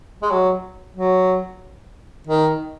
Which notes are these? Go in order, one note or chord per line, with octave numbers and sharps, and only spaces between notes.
G#3
F#3
F#3
D#3